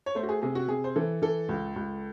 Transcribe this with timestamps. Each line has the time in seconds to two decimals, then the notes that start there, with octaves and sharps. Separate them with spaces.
0.06 C#5
0.15 A3 C5
0.23 F#4
0.29 G#4
0.42 C3 G#4
0.55 F#4
0.68 C3 G#4
0.84 C5
0.96 E3 A4
1.22 E3 A4
1.49 C#2
1.76 C#2